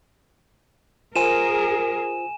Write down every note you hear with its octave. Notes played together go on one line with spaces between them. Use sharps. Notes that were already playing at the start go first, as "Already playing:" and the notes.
F4 G#4 A#4 C5 G#5 D#7 E7